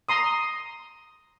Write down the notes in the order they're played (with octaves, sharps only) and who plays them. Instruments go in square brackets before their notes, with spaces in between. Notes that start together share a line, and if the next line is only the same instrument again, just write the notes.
[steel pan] A#5 C6 D#6